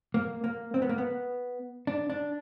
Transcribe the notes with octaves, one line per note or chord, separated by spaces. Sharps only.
A#3
A#3
C4
B3
A#3
B3
D4
D4